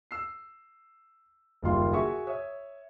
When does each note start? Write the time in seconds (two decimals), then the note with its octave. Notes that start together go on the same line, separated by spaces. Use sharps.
0.11 E6 C7
1.62 F#1 D#2 G3 F4 C6
1.93 F#4 G#4 E5 C#6
2.27 C#5 E5 D#6